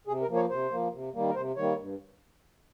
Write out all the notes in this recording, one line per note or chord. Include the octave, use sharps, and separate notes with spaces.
C3 G#4
A#4
F3 A#3
C#5
C3 C5
F3 A#3
C3
D#3 G3 A#3
A#4
C3 C5
D#3 G3 A#3 C#5
G2